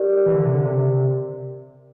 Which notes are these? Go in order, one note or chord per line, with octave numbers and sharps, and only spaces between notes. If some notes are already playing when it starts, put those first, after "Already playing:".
Already playing: G4 A#4 D5
E3
D3
C3
D3
C3